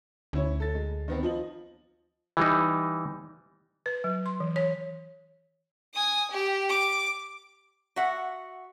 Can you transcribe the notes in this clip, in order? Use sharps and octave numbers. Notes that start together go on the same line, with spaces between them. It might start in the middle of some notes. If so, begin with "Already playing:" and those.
D2 C#4 E4 C#5
A4 A6
G#3
D#3 B3 C4
F3 D#5 F#7
E3 G3 D#4
B4
F#3
C6
E3
C#5
G#5 D#6
G4
D6
F#4 E5 F#5